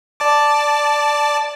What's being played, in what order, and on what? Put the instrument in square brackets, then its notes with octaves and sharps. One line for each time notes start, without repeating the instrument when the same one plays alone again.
[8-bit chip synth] D5 A5 D6